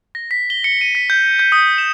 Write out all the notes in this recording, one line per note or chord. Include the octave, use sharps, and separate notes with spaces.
A#6
B6
G7
C#7
D#7
B6
G6
G6
D#6
E7